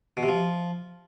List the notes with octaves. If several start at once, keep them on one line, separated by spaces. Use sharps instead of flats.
B2
C3
F3